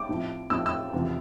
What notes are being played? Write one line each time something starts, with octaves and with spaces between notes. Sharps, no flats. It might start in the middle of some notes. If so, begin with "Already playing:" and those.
Already playing: D6
A2 F3 C4 E4
A2 F3 C4 E4 E6
E6
E2 C3 F3